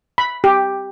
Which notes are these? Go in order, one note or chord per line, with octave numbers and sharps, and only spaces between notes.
B5
G4